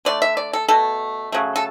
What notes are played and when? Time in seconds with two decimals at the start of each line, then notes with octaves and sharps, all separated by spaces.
0.05 D3 A3 D5
0.22 E5
0.37 D5
0.53 A4
0.69 B2 A3 A4
1.32 C#3 F#3 A3
1.56 A4